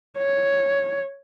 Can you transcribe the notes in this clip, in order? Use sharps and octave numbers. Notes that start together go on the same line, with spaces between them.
C#5